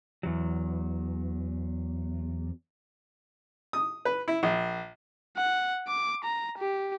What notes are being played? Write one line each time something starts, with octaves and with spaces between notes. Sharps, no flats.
E2 F#3
D#6
B4
E4
A#1
F#5
D6
A#5
G4